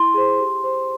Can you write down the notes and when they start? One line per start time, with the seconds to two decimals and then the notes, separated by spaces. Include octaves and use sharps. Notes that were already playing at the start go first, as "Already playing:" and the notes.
Already playing: E4 C6
0.14 G#4 C5
0.39 G4
0.64 C5